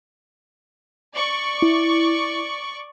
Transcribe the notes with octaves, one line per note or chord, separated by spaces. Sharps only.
D5 C#6
E4